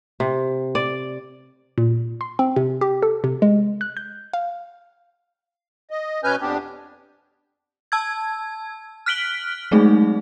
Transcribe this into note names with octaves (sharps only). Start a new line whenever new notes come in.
C3
D5
A#2
C6
C4
C3
G4
A4
C3
G#3
F#6
G6
F5
D#5
B2 C#4 B4 G#5 F6 G6
F2 B3 D4 G4
A5 E6 G#6
F6 F#6 B6 D7 F#7 G7
F#3 G#3 A3 C4 D#4 G#4